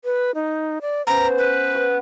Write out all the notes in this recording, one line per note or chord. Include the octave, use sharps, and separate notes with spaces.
B4
D#4
D5
B3 C#4 C5 A#5
B4
F#5 C#6